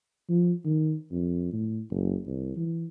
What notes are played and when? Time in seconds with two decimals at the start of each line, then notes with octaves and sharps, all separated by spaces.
0.29 F3
0.65 D#3
1.12 F2
1.53 A2
1.91 F#1
2.27 C2
2.56 E3